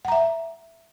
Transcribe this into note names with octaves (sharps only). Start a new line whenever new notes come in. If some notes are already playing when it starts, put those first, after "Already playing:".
E5 F#5 A#5